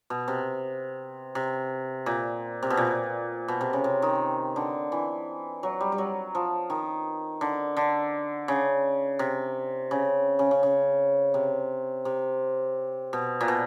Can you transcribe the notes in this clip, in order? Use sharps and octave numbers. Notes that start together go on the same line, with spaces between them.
B2
C3
C3
A#2
C3
B2
A#2
B2
C3
C#3
C3
D#3
D3
E3
F#3
G3
G3
F#3
F3
D#3
D3
D3
C#3
C3
C#3
C#3
C#3
C#3
C3
C3
B2
A#2
B2